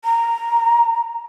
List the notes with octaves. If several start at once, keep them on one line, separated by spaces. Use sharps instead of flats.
A#5